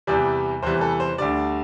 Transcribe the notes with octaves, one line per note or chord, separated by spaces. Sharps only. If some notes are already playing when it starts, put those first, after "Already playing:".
E2 C3 E3 G3 D5
E2 C3 E3 G3 C5
A4
C5
D2 D3 G3 D5